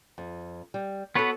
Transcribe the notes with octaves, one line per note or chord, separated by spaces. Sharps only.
F2
G3
B3 F#4 G#4 A4 B4 C#5